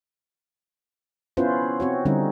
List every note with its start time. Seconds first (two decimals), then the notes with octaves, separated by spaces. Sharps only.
1.37 B3 C#4 E4 F4 B4 C5
1.80 C4 F#4 C#5
2.05 D3 G3 C4 C#4 D#4